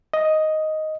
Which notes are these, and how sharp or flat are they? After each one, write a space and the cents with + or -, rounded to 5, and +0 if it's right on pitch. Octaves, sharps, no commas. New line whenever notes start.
D#5 +5